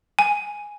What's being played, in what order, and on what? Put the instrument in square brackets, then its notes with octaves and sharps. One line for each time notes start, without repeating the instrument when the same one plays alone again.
[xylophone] G#5